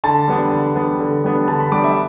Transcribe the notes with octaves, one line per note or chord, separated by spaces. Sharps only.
D3 A5
G3 B3 D4
D3
G3 B3 D4
D3
G3 B3 D4
D3 A5
B5
G3 B3 D4 D6
E5